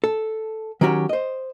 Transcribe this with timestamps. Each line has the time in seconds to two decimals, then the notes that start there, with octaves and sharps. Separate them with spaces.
0.04 A4
0.81 D#3 F#3 C#4 F#4 G4 C#5
1.09 C5 D#5